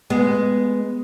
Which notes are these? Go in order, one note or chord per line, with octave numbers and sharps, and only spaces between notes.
G#3 B3